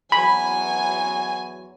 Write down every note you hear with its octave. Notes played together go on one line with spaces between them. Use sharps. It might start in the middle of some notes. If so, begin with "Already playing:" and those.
E2 E3 F#3 G#5 B5